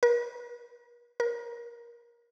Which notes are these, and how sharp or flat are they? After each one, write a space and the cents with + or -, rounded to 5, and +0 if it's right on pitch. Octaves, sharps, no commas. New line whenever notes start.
A#4 +45
A#4 +20